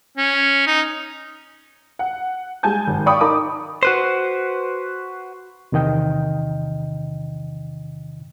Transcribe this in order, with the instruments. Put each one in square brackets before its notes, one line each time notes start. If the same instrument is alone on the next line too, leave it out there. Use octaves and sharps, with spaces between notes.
[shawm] C#4
D#4
[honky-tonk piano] F#5
G3 G#3 G#5 A5 G6
G#1
D5 F5 G5 B5 C#6 D#6
D#4 A#4 A5 B5 D6
[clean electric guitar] F#4 B4 C5
[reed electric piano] E2 C3 D#3 D#5 G5